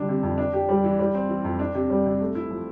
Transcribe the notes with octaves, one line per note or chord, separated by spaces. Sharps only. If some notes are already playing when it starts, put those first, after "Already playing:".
Already playing: D3 G3 D4
C3
F2
D4
G4
G3
E3
G3
C4
E3
F2
D4
C3
G3
C3
A3
E4
F3